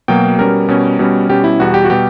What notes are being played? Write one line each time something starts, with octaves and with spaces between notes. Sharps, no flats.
B2 F#3 A#3 G5
B2 G3 C#4 A#4
B2 G3 C#4
B2 G3 C#4
B2 G3 C#4 G4
E4
E2 B2 G3 F#4
G4
F#4
B2 G3 G4